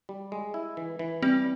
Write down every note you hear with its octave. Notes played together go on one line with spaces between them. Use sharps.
G3
G#3
E4
E3
E3
G3 C4